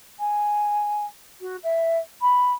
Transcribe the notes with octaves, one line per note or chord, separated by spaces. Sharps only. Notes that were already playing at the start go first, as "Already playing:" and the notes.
G#5
F#4
E5
B5